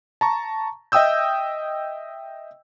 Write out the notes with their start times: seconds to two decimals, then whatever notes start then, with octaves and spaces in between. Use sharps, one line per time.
0.21 A5 A#5 C#6
0.92 D#5 E5 G5 D#6 E6 G6